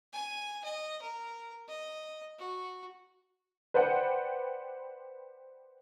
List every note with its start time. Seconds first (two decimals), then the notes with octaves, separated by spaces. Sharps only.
0.13 G#5
0.64 D#5
1.02 A#4
1.68 D#5
2.38 F#4
3.74 B4 C5 D5 F#5 G5